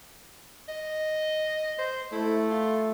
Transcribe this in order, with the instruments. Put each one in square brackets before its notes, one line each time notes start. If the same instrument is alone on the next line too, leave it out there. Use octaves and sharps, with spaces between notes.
[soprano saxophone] D#5
C5
[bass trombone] A3 [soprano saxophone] E4
[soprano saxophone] F4